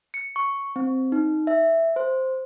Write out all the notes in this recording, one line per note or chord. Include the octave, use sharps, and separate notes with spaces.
C#7
C#6
C4
D#4
E5
C5